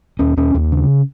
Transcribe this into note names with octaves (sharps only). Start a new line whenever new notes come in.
D#2 C#4
D#2 C#4
D#2
C#3